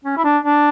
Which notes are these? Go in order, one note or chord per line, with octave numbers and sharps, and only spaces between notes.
C#4
E4
D4
D4